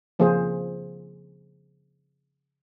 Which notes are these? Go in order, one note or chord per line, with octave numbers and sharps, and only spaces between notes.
C#3 F3 A#3 F4 G#4 C5